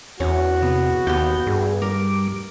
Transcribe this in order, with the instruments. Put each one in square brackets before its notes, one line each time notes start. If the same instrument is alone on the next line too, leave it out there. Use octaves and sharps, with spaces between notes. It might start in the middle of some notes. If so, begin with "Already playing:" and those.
[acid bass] E2 [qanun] C#4 [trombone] F#4 [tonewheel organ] C#5
[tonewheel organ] C3 [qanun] B3
[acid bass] D#2 [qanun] B3 G4 [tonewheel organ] G6
[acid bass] G2 [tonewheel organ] G#4
[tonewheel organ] G3 D6 [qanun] A#4